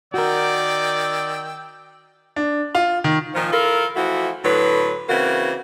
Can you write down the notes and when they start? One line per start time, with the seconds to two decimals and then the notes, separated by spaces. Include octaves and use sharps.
0.14 D#3 F#4 A#4 D5 G5 E6
2.36 D4
2.75 F4
3.04 D#3
3.35 A#2 D#3 F3
3.51 E4 F4 A4 A#4
3.96 E3 F3 A3 F#4
4.44 A2 D3 F#3 B4
5.09 C#3 E3 A#3 C4 F#4